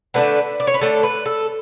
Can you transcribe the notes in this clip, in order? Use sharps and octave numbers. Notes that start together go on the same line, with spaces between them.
D3 A3 D4 B4
D5
C#5
B4
D3 A3 D4 A4
B4
A4